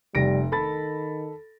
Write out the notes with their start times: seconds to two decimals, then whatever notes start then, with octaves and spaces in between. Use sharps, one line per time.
0.15 F1 G3 A#6 D7
0.52 D#3 A4 B5 A6